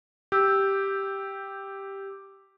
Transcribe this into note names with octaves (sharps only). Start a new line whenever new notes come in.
G4 E6 G6